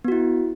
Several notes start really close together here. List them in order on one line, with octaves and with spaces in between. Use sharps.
B3 F#4 E4